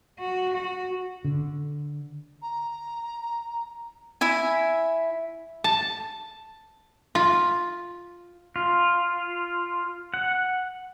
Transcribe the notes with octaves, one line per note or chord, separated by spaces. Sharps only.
F#4
F#4
D3
A#5
E4 E5 G#5
A5
F4
F4
F#5